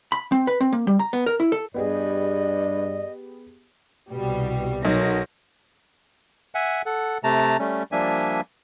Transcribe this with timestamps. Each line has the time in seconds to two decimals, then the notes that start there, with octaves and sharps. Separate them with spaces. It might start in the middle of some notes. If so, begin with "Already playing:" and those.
0.12 B5
0.32 C4
0.47 B4
0.61 C4
0.73 A#3
0.87 G3
0.99 A#5
1.13 B3
1.26 A#4
1.40 E4
1.52 A4
1.74 G2 B3 G4 G#4 D5 D#5
4.12 C2 B2 G3
4.85 B1 F#3 D#4 A#4 A#6
6.55 E5 F#5 G#5
6.86 A4 F#5
7.24 C3 A3 A5 A#5
7.59 G3 A3 C#4
7.92 F3 G3 A#3 D4 E5 G#5